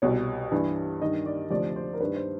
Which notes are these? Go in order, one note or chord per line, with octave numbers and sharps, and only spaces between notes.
C2 B2 C#5
G2 E3
G2 D#3 D#5
D5
D2 C3 F3 D5
C5
A#4
G2 D#3 B4
C5